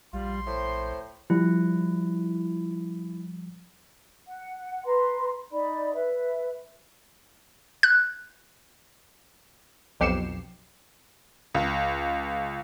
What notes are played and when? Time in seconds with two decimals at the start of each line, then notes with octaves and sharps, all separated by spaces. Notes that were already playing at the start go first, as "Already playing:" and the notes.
0.13 A#1 G3 F4 C6
0.47 A2 C5
1.30 F3 G3 E4
4.27 F#5
4.85 B4 A#5 C6
5.51 D#4 D5 B5
5.94 B4 E5
7.83 F#6
10.00 B1 F2 G4 C7 C#7 E7
11.54 C#2